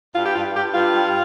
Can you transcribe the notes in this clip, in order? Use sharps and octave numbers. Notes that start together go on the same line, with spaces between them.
G2 F4
G4
G2 F4
G2 G4
G2 F4
G3